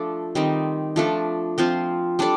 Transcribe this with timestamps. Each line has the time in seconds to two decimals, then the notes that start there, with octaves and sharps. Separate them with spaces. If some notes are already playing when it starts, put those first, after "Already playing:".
Already playing: F3 A3 D4 A4
0.35 D#3 G3 C4 D#4
0.96 F3 A3 D4 A4
1.58 F3 C4 F4 C5
2.19 G3 D4 A4 D5